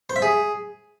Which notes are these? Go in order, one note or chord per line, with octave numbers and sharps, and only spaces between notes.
C5
E5
G#4